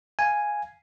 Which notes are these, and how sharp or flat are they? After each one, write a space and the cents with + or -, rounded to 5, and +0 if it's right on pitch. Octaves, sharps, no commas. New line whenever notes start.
F5 +0 G#5 +0